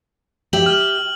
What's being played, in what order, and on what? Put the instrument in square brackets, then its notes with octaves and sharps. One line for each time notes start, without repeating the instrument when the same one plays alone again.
[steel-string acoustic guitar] G4 E5 [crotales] F#7
[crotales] F6